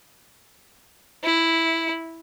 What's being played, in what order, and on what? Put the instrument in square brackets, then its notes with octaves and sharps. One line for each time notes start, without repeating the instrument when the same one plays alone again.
[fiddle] E4